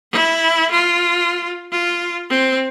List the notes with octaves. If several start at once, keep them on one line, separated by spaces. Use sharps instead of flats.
E4
F4
F4
C4